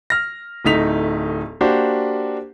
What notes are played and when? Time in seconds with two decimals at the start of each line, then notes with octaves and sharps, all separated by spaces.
0.10 F6 A#6
0.65 D1 A3 D#4 B6 F7
1.61 A#3 D4 F#4 G4 C5